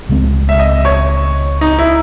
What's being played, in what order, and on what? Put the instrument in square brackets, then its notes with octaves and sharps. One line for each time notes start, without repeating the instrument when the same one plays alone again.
[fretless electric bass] C#2 C#3 G#3 C4
[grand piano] E5
D#5
C#5
D#4
E4